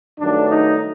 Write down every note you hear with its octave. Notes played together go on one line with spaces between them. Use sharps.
G2 D#3 F#3 A3 D4
D#4